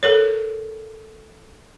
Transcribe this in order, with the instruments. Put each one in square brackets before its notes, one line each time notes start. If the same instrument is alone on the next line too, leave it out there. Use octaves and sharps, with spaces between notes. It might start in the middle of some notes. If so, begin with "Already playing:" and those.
[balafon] A4 A#4 C#5